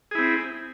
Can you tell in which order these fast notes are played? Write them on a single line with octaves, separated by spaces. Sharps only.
G#4 E4 C4